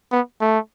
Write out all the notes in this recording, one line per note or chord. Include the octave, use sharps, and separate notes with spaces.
B3
A3